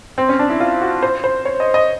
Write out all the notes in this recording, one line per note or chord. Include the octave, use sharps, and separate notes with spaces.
C4
C#4
D4
E4
F4
F#4
C5
C5
C#5
D#5
D#5